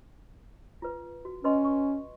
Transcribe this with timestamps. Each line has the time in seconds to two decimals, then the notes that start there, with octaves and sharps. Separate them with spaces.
0.82 F4 B4
1.25 F#4
1.44 C#4 B4 D#5 C6
1.65 C#6